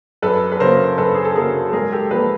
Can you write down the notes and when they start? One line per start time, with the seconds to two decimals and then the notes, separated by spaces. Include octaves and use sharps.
0.22 F#2 A4 B4
0.52 B4
0.60 C#3 F#3 A#3 A#4 C5
0.98 F#2 A4 B4
1.14 G#4
1.25 A4
1.35 C#3 F#3 A#3 G#4 A#4
1.69 A4
1.73 G#2 G#4 A#4
1.92 G4 A4
2.11 F3 A#3 A4 B4